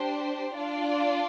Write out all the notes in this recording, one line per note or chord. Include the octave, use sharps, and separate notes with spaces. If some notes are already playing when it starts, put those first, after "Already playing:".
Already playing: D4 G4 C5
D4 F4 D5